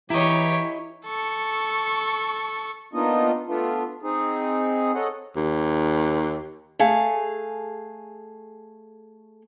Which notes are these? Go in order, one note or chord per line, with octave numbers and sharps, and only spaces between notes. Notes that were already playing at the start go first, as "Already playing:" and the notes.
E3 E4 G4 C#5 D#5 A#5 C#6
A4 C#6
A#3 B3 D4 D#4 F4 D#5
A3 B3 D4 F4
C4 D#4 G#4
A4 C#5 D#5 F#5
D#2
A3 G#4 F5